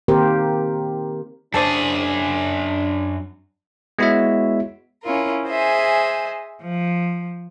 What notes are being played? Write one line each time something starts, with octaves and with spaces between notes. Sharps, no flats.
D#3 A#3 C4 G4 A#4 C5
F#2 D4 G#4 A4 C5 D5
G#3 B3 E4 F#4 C#5 E5
C#4 E4 F4 A#4
G#4 C5 D#5 E5 G#5
F3